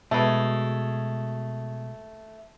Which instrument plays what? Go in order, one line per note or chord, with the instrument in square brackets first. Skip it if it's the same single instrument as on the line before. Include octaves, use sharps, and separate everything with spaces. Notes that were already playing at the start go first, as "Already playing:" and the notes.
[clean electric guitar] B2 G#3 [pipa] A3 B4